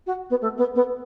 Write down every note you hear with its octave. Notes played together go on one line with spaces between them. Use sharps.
F#4
B3
A3
B3
B3